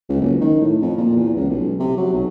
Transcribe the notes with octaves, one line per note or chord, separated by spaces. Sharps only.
C#2
F#1
D#3
A2
F2
A#2
E2
C#2
B1
C3
F#3
B1